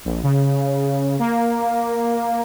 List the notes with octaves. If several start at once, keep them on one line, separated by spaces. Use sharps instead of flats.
A#1
C#3
A#3